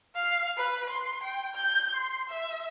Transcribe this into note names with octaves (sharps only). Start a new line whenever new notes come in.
F5
B4
C6
G5
G6
C6
E5